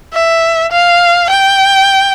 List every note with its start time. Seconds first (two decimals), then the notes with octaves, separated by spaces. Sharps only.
0.13 E5
0.72 F5
1.30 G5